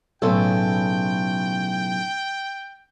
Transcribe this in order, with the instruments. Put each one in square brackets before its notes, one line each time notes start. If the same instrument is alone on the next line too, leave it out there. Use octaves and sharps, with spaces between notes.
[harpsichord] B1 [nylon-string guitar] A2 C#3 A4 [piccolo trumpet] G5